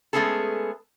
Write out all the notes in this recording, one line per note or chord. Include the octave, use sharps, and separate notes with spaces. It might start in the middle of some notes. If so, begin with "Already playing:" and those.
G#3 A3 B3 C#4 G#4 A4